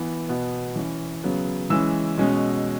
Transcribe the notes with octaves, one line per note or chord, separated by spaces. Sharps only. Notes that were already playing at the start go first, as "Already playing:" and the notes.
Already playing: E3 B3
B2 B3
E3 C#4
C#3 F#3 B3
E3 G#3 C#4 E6
B2 G#3 C#4